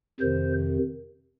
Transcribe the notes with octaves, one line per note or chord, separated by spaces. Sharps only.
F2 C3 D#3 C5